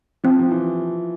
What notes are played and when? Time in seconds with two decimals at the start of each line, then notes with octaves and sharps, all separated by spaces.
0.24 F3 C4
0.39 F3
0.51 E3